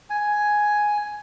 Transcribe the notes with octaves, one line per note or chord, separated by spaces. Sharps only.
G#5